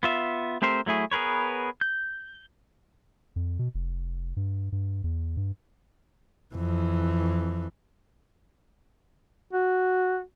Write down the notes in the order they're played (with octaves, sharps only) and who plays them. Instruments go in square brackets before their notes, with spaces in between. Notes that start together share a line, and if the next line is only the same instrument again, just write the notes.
[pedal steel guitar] B3 F4 E5
A3 C4 G4 A#4 C5
F#3 A3 E4 G#4
B3 G#4 A#4 B4 C#5
G6
[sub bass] F2
B2
F1
G2
G2
E2
G2
[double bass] F2 E3
[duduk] F#4